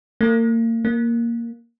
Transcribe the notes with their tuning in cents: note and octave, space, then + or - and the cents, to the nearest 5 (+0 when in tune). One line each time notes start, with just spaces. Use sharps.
A#3 -35
A#3 +0